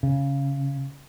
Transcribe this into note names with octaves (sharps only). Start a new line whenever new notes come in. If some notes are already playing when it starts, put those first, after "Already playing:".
C#3